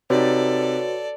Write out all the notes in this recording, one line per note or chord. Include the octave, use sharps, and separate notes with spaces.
C3 D#4 F#4 A4 B4 C#5 D5